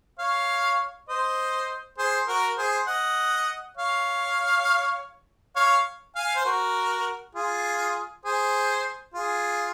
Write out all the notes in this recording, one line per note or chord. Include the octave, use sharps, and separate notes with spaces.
C#5 F5
C5 D#5
G#4 C5
F#4 A#4
G#4 C5
D#5 F#5
C#5 F5
C#5 F5
F5 G#5
C5
F#4 A#4
F4 G#4
G#4 C5
F4 G#4